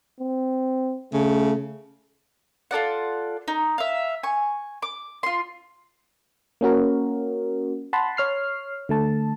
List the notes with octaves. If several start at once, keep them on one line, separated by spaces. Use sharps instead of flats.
C4
C#3 A3
F4 A4 D5 F#5
D#4
E5 F5
G#5 C#6
D6
F4 C6
A#3 C#4 F#4 A#4
F#5 A5 B5 C6
C#5 F6 C7
D3 A3 A5